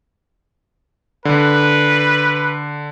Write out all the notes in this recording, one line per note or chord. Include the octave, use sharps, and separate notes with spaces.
D3 B4